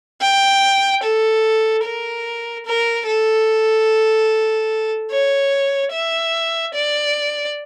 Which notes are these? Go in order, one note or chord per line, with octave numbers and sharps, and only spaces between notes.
G5
A4
A#4
A#4
A4
C#5
E5
D5